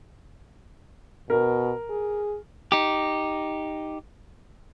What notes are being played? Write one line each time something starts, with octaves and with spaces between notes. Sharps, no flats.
B2 A#4
G#4
D#4 G4